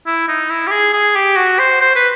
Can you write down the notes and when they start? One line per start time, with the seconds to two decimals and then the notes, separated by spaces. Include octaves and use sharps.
0.06 E4
0.28 D#4
0.50 E4
0.67 G4
0.71 G#4
0.93 G#4
1.15 G4
1.37 F#4
1.59 C5
1.81 C5
1.95 B4